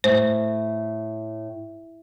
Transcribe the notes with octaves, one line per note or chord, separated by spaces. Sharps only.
A2 C5